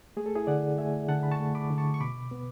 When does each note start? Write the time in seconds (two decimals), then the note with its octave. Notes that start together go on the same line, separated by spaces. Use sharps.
0.17 A3 G#4
0.26 A4
0.36 E4 G#4
0.47 D3 D5 F#5
0.78 A3 E5 G#5
1.09 D3 F#5 A5
1.23 B5
1.31 A5 C#6
1.39 A3
1.55 B5 D6
1.70 D3
1.78 A5 C#6
1.94 C#6
2.00 B2 B5 D6
2.31 B3